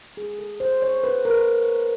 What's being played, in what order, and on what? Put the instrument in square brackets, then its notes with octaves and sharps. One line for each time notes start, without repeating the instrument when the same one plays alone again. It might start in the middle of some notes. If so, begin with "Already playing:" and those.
[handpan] G#4
A4
C5
C#5
B4
A#4